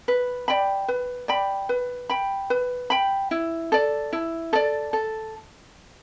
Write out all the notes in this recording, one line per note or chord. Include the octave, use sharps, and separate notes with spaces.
B4
D5 G5 B5
B4
D5 G5 B5
B4
G5 B5
B4
G5 B5
E4
A4 D5
E4
A4 D5
A4